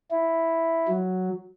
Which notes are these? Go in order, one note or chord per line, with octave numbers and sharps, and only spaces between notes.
E4
F#3